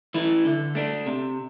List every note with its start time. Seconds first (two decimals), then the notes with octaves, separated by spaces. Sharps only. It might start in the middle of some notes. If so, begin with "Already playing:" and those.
0.14 E3 A3 E4
0.45 D3
0.75 A3 D4
1.06 C3